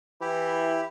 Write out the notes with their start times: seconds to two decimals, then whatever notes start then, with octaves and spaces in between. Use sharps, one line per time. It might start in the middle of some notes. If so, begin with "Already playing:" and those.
0.21 E3 E4 G4